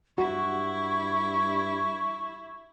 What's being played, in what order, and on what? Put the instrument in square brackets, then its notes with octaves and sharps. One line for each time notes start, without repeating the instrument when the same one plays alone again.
[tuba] G2 [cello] E4 [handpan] F#4 [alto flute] C#6